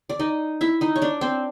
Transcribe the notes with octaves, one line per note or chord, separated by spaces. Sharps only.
D5
D#4 D#5
E4 E5
D#4 D#5
C#5
D4 D5
C4 C5